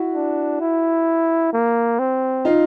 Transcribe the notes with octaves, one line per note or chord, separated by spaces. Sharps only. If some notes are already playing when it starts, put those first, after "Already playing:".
Already playing: E4 F#4
D4
E4
A#3
C4
D#4 F4